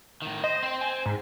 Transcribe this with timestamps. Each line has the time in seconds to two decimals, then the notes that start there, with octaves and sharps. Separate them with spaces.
0.22 A2 D#3
0.44 C5 D#5
0.63 C4 C5 C6
0.81 G#5
1.06 G#2